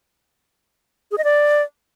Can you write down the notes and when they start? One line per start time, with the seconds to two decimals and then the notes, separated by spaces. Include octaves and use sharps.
1.11 G#4
1.18 D#5
1.24 D5